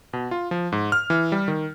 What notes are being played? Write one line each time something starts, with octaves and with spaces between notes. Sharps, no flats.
B2
F4
F3
G#2
F6
E3
G3
D#3